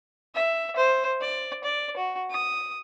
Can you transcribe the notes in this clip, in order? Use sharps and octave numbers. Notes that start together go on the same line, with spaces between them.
E5
C5
D5
D5
F#4
D#6